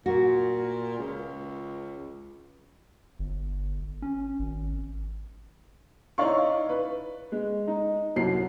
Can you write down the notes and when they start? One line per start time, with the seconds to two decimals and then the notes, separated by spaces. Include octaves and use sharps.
0.06 A#2 F#4
0.99 C#2
3.19 G1
4.02 C#4
4.39 G#1
6.18 D#4 E4 C#5 D5 F5 C#6
6.69 B4
7.32 G#3
7.67 D#4
8.16 C2 F#2 C7